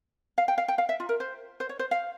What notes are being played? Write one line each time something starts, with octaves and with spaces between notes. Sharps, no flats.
F5
G5
F5
G5
F5
E5
F4
A#4
C5
C5
C#5
C5
F5